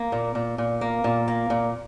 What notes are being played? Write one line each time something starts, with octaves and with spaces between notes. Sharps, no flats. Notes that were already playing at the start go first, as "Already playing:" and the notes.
Already playing: A#3
A#2
A#2
A#2
A#3
A#2
A#3
A#2